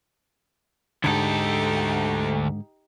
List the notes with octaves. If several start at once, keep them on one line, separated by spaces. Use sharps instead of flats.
D2 G#2 D3 D#4 G4 A4